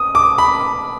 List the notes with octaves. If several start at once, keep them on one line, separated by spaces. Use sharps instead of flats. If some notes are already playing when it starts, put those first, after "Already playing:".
Already playing: D#6
D6
B5